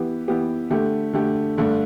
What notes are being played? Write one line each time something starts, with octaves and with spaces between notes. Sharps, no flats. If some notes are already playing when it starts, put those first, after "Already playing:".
Already playing: E3 B3 G4
E3 B3 G4
D3 A3 G4
D3 A3 G4
G2 D3 A3 D4